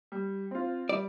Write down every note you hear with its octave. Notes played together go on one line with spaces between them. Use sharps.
G3
C4 F4
G3 D5